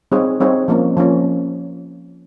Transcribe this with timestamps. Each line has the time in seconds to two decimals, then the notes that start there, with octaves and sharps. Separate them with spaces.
0.12 G3 C4 D#4 G#4 C#5
0.40 G3 C4 D#4 G#4 C#5
0.68 F3 A#3 C#4
0.97 F3 A#3 C#4